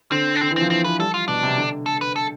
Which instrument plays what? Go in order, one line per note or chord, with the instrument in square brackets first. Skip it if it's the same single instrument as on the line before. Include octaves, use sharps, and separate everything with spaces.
[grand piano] D3 [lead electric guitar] C4
[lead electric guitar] D4
[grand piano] D3 [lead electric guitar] C4
[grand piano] E3
[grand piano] F3 [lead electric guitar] C4
[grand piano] E3 [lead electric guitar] C4
[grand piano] E3 [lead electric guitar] B4
[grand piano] G3 [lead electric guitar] A4
[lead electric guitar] F4
[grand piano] B2 [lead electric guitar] D4
[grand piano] C3
D3
[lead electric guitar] A4
B4
A4